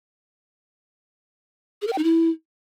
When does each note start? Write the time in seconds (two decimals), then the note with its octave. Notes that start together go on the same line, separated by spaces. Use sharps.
1.82 G#4
1.87 A#4
1.93 G5
1.98 D#4
2.04 E4